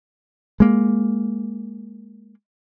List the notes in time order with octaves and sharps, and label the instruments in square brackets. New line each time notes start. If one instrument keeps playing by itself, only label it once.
[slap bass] G#3 A#3